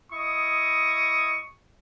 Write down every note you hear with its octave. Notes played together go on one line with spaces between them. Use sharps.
E4 D#5 C#6 D#6